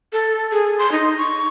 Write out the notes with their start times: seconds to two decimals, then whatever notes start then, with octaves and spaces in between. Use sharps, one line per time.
0.13 A4
0.52 G#4
0.79 C6
0.92 D#4
1.18 C#6